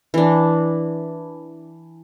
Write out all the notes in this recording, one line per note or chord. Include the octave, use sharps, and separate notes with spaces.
E3 D4